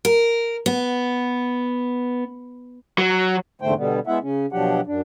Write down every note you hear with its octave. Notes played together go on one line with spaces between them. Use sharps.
A#4
B3
F#3
E2 G#2 D3 A3 C5 G5
B2 D3 G3 B3
G#3 B3 E4 E5 F#5
C#3 C#4
B2 F3 F#3 D4 G4 F#5
F#2 D4